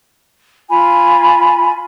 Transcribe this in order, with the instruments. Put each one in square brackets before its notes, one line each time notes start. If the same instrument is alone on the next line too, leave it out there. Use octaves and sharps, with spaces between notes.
[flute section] F4 G#5 B5